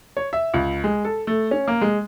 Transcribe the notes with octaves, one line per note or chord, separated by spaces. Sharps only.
C#5
E5
C#2
G#3
A4
A3
C#4
A#3
G#3